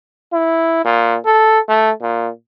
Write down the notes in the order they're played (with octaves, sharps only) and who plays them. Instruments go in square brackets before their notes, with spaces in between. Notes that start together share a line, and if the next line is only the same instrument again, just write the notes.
[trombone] E4
A#2
A4
A3
A#2